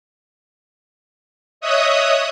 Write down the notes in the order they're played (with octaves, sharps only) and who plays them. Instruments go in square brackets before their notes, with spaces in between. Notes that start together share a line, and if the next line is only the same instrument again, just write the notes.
[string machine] C#5 D#5 E5 D#6 F#6